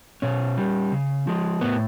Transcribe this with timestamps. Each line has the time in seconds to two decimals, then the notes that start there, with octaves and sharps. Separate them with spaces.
0.22 B2 C#4
0.58 G3
0.92 C#3
1.27 F3 G#3
1.61 A2 B3